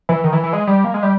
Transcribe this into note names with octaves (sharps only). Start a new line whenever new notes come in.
E3
D#3
E3
E3
G#3
G3
A#3
G#3
G3